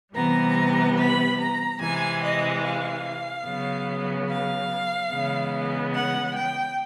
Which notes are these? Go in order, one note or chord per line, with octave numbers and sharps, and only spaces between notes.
C3 E3 G3 B3 A#5
B5
A#5
C3 E3 G#3 G#5
D#5
F5
C#3 F#3 B3
F5
C#3 E3 G#3 B3
F#5
G5